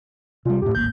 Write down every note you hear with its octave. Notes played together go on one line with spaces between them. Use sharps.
C3 G3 F4
F2 A2 G4
D1 G#1 A#3 G6